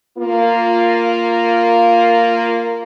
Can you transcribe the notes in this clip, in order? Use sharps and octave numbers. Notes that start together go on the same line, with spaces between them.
A#3 F4